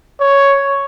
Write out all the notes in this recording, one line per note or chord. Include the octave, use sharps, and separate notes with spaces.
C#5